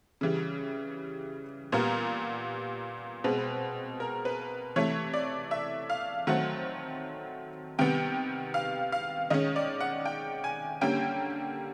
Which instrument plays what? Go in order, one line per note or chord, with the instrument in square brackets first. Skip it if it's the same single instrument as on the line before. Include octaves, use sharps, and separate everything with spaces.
[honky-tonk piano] C#3 E3 G3
A#2 G3 B3 A#4
B2 G#3 C4 B4
A#4
B4
C3 E3 A3 C#5
D5
E5
F5
D#3 F#3 A3 C4 F#5
C3 D#3 G3 B3 G5
F5
F5
D#3 G#3 C#4 D#5
D5
F#5
G5
G#5
D3 G3 A#3 C#4 G5